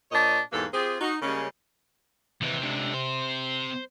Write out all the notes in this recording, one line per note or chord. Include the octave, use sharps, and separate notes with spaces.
A#2 D4 C5 C#5 D#5
E2 G#2 A#3 G4 A4 B4
C4 F4 G4 G#4
D#4 F#4
C#3 G3 G#3 A#3 C#4
D#2 C3 E3
C#2 D3
C5